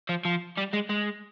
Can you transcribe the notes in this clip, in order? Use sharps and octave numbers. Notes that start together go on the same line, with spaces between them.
F3
F3
G3
G#3
G#3